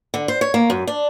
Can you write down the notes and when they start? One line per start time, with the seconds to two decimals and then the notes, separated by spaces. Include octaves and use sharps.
0.14 D3
0.28 C5
0.41 C#5
0.54 A#3
0.70 F#2
0.87 D4